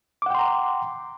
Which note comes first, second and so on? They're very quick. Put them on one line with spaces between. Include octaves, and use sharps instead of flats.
D6 F#5 G5 C6 A#5